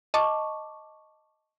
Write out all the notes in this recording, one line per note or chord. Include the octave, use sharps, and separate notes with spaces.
D#5 A5 C#6 D6